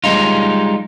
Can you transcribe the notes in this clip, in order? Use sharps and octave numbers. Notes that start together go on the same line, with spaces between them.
G3 G#3 D#4 F4